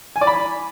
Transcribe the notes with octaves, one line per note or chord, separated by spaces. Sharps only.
G#5
D5
B5